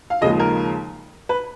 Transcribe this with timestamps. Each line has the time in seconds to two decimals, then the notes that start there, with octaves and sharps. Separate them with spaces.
0.10 F5
0.21 D#2 C#3 F3 G#3 D#5
0.39 A#4
1.29 B4